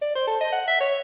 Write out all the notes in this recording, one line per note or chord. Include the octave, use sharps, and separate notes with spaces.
D5
C5
A4
D#5
F#5
E5
C#5